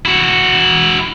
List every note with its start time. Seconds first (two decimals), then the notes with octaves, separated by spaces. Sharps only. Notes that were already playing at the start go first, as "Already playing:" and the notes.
0.05 E4 F#4